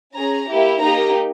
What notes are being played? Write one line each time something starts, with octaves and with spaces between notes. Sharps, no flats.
C#4 G#4 A#5
A#3 E4 G4
A#3 D#4 G4 A#5